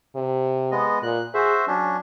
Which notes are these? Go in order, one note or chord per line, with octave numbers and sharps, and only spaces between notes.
C3
G#3 B3 D#5
A#2 F#6
F#4 G#4 C5 E5
F#3 C#4 D4